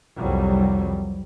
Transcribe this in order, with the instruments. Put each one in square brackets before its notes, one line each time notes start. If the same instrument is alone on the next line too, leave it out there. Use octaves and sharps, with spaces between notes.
[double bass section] C2 F2 F#3 G3